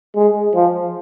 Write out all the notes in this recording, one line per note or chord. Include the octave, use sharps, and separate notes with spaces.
G#3
F3